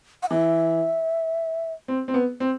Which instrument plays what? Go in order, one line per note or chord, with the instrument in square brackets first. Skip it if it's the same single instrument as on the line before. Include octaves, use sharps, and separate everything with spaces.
[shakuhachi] F#5
[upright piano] E3 [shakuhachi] E5
[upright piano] C4
C4
B3
C4